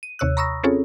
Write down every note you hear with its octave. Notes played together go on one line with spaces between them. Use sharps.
D#7
D#2 C3 C#5 E6 F#6
A#5 B5 C#6 D#6 E6 A#6
C4 C#4 F4 G#4 A4 C#5